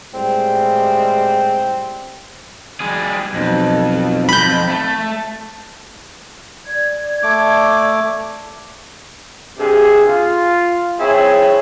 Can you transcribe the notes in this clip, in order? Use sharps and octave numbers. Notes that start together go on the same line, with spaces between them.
A2 G3 G#3 C4
G3 G#4
B1 F2
F2 G#2 B5 G6
A3
D5 G#6
A3 D6
G2 C3 G#4
F4
C4 E4 G#4 C#5